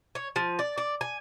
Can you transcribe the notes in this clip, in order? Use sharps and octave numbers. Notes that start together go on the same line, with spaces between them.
C#5
F3
D5
D5
G#5